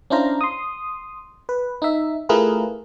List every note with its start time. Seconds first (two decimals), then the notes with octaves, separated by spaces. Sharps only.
0.10 C#4 D4 E4 C5 F5 A#5
0.41 C6 D#6
1.49 B4
1.82 D#4 E5
2.29 A3 E4 F4 G#4 A#4 B4